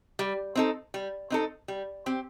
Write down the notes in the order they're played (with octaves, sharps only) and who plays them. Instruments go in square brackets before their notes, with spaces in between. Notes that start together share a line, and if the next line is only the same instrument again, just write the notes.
[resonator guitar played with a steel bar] G3
C4 D#4 A4
G3
C4 D#4 A4
G3
C4 G4